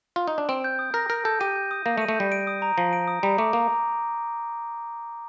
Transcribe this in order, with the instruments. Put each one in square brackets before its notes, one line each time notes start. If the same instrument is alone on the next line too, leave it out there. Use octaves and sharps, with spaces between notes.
[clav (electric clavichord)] F4
D#4
D4
[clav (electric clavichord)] C4 [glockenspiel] D7
[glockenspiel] G6
D#6
[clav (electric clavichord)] A#4 [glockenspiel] A#6
[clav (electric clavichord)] A#4 [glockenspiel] D7
[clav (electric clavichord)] A4 [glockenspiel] G6
[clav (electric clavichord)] G4 [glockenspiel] D#7
[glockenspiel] G6
D#6
[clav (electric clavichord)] A#3 [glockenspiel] A#6
[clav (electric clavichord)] A3
[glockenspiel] D#7
[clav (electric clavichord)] A3
[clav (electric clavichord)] G3 [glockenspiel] G6
[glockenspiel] D7
D#6
A#5
[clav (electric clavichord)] F3 [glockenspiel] A#6
[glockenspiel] D7
D#6
[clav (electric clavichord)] G3 [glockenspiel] A#5
[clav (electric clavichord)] A3 [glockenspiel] D6
[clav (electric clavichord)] A#3 [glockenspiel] A#5